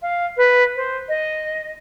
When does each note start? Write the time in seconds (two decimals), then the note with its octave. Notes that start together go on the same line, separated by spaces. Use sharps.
0.02 F5
0.37 B4
0.76 C5
1.08 D#5